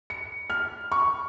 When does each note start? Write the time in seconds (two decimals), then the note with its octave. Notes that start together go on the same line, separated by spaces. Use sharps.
0.10 C#7
0.50 F6
0.92 C#6